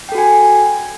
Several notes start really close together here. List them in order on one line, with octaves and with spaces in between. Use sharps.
G5 A4 F#4 G#5